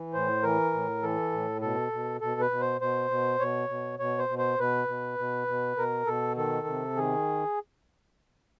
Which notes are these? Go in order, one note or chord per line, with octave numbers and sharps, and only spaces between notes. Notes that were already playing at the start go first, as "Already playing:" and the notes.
Already playing: E3
A2 C5
E3 A#4
A2
E3 A4
A2
B2 A4
B2
B2 A4
B4
B2
C5
B2 C5
B2
B2 C#5
B2
B2 C#5
C5
B2
C5
B2 B4
B2
B2
B2
B2 A#4
B2 A4
D#3 A4
C3
D#3 G#4